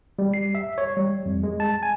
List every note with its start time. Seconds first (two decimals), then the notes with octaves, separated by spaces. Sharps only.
0.19 G3
0.34 C7
0.55 E5
0.78 C#5
0.97 G3
1.26 F2
1.43 G#3
1.60 A5
1.83 G#5